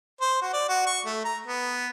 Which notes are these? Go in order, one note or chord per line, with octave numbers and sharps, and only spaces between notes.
C5
F#4
D5
F#4
C#6
A3
A#5
B3